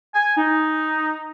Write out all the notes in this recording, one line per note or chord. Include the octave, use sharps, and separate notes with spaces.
G#5
D#4